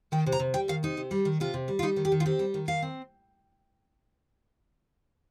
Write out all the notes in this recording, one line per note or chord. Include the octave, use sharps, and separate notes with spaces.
D#3 G5
C3
A#5
C3
G3 G5
D#3 F5
C3 D#4
C3
G3
D#3
C3 F4
C3
G3
F4
G3 D#4
D#3
G4
D#3
F4
C4 G4
G3
D#3
D#3 F5
C4